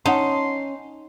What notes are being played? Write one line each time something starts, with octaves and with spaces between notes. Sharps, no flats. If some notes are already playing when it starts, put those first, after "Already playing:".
C#4 D#4 F#5 A5 C6